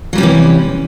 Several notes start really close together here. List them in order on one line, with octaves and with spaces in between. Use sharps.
F#3 G3 C#4 C3 E3